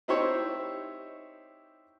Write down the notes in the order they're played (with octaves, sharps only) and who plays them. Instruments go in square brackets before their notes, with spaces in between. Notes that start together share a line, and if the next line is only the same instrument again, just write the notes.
[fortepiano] C4 D#4 E4 G4 C5 C#5